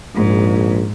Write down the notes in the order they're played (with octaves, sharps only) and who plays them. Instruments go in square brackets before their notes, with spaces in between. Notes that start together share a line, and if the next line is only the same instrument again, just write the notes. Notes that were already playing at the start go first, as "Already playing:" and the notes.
[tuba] A#1 [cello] G#2